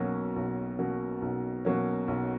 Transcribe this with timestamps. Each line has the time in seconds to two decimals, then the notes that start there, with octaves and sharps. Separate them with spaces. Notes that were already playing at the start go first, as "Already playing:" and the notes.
Already playing: B1 B2 F#3 A#3 C#4
0.36 B1
0.79 B2 F#3 A#3 C#4
1.22 B1
1.65 B2 F#3 A#3 C#4
2.08 B1